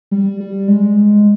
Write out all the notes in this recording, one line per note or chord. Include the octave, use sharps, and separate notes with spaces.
G3
G3
G#3